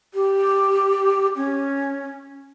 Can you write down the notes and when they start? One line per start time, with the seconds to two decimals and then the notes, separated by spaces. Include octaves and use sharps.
0.14 G4
1.36 C#4